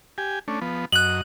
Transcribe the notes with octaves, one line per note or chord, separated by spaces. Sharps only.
G4 G#5
A3 C#4 D4
F3 B3
F#2 D#5 F#6 F#7